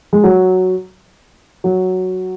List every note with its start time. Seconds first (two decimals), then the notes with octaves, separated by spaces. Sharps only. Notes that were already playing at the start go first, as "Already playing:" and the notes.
0.13 G#3
0.24 F#3
1.64 F#3